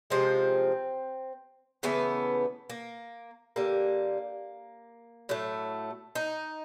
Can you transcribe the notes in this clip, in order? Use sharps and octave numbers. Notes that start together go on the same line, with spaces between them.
C3 F3 G#3 C4
C#3 E3 A3 B3
A#3
D3 G3 A#3
A2 F#3 A3
D#4